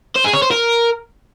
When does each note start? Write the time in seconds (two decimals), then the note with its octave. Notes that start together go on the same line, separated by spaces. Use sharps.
0.16 C5
0.25 G#4
0.34 C#5
0.42 C5
0.51 A#4